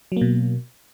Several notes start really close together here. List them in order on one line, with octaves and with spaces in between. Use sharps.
F#3 A#3 B2